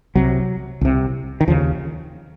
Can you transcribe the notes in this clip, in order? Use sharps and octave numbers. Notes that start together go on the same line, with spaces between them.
C2 C3 F#3
C2 C3
D#3
D#2 C#3 F3